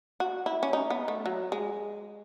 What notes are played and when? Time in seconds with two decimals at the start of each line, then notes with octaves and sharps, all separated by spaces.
0.20 F#4
0.46 E4
0.63 C#4
0.73 D#4
0.90 B3
1.08 A3
1.26 F#3
1.52 G#3